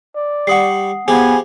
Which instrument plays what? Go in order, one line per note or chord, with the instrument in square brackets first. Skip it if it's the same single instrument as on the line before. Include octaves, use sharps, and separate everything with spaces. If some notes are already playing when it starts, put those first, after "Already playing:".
[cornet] D5
[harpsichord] G3 B5 C#6 [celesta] F#5 D#6 C7
[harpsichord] F3 G4 G#4 [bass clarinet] B3 [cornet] G#5